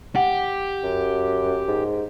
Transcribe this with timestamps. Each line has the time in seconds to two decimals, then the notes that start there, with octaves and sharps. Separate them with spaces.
0.15 G4 F#5
0.83 F#2
1.68 G#2